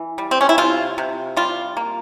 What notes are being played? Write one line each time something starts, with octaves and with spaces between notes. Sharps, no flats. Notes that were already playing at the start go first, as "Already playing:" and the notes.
Already playing: E3
G3
C4
C#4
E4
C3 F4
C3
G3 F4
A#3